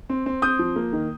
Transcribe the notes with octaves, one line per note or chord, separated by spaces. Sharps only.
C4
C4
C4 D#6 G6
F3
A#3
D#3